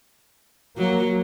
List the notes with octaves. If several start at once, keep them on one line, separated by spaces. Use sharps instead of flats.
F#3 A#3